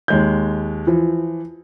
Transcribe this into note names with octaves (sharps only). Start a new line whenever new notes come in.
D#2 G#3 G6
E3 F3